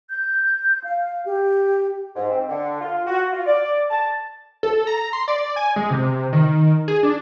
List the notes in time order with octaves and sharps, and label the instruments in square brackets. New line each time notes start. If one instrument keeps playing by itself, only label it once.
[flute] G6
F5
G4
[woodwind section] G#2
C4
D3
F4
F#4
F4
D5
A5
[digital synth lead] A4
A#5
C6
D5
G#5
G#3
C3
D#3
G#4
D4